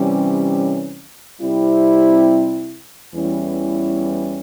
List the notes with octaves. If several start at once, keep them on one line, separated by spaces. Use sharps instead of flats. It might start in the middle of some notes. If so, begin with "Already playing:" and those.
Already playing: C3 E3 G3 C#4
C3 G3 C4 E4
E2 E3 G3 C#4 E4